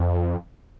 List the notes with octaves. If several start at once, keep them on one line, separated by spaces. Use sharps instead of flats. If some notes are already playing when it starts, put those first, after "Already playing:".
Already playing: F2